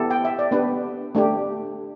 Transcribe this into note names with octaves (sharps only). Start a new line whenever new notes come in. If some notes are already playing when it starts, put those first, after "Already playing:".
Already playing: B3 E4 G4 A4
G5
E5
D5
B3 D4 G4 B4
A3 D4 G4